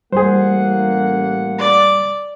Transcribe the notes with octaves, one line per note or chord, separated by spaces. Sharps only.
A1 G3 A#3 G#4 C5 F#5
D5